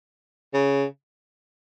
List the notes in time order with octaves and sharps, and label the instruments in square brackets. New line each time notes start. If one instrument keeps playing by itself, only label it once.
[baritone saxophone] C#3